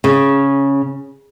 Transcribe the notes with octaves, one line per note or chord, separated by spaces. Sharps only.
C#3